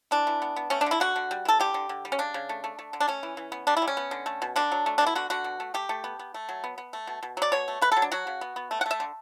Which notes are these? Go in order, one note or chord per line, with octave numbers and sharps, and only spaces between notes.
E3 D4
E3
B3
B3
A3 C#4
D4
D3
E4
D3 F#4
D3
G3
E3 A4
D3 G4
D3
D3
G3
C#4
C#3 D4
C#3
A3
A3
A3
D3
D4
A3 C#4
E3
E3
B3
G3 D4
E4
G3
C#4
B3
D3
A3
B2
D3 D4
F#3
A3
B2 D4
E4
D3 F#4
D3 F#4
B2
A3
A3 G4
A3
B3
B3
A3
F#3
B3
B3
A3
B2
B2
F#3 D5
B2 C#5
A3
A3 B4
F#3 A4
D4
F#3 F#4
C#3
B3
B3
A3
F#5
A3 E5
D3